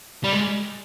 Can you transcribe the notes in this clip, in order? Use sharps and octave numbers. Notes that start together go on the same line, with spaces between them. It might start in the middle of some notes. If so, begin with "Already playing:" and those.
G3
G#3